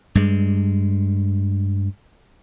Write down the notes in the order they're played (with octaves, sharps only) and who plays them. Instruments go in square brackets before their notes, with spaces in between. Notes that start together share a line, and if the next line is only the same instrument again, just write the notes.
[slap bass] G2 G#3